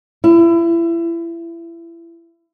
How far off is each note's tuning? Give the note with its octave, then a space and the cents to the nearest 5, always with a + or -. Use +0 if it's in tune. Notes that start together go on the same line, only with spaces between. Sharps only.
E4 +30